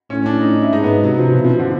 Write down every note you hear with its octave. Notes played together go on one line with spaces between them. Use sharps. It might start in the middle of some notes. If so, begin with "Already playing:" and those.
A2 C#4
D4
D#4
E4
G#2 D#4
B3
F#3
C3 F#3
F3
B2 E3
F3
D3